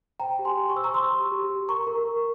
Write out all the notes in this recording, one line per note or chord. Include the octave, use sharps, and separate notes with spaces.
C5 G5 A#5
G4
G#5 C6
G4
C#6
C5 E6
A#5 C#6
C5 C6 E6
G4
G4
G4
A#4 A#5 C#6
A#4
A#4